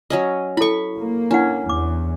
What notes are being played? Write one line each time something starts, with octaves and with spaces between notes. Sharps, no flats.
F#3 C#4 D#5
E4 A4 B5 C#6
A#3
C#4 D4 E4 F#5
E2 D6